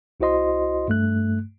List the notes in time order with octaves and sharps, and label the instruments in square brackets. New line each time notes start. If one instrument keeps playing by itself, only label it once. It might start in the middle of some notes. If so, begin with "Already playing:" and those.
[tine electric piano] C2 E4 F#4 C5 D#5 C6
G2 A3 F#6